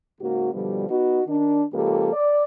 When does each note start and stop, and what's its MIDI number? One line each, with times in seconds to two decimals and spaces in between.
0.21 0.52 44
0.21 0.52 49
0.21 0.52 58
0.21 0.52 66
0.53 0.88 47
0.53 0.88 50
0.53 0.88 53
0.53 0.88 55
0.89 1.22 59
0.89 1.22 63
0.89 1.22 66
1.27 1.63 51
1.27 1.63 62
1.74 2.13 37
1.74 2.13 53
1.74 2.13 58
1.74 2.13 67
1.74 2.13 69
2.13 2.44 74